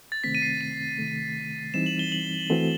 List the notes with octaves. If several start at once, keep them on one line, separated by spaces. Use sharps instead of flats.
A6
C3 D#3 A3 C4 B6
D#7
C7
D#7
C3 D#3 A3
E3 G3 C4 D#4 E7
F#7
G7
F#7
E3 A3 C4 F#4 A4